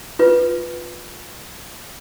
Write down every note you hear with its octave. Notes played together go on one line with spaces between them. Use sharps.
F4 B4